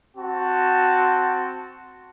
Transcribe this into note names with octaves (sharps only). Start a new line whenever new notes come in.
C4 F#4 A5